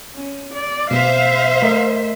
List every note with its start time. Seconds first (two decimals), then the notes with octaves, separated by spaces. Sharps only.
0.15 C#4
0.54 D5
0.91 B2 C5 E5 F5
1.62 A3 A#4 D#5